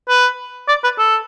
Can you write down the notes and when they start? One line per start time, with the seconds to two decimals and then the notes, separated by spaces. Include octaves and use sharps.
0.09 B4
0.69 D5
0.84 B4
0.99 A4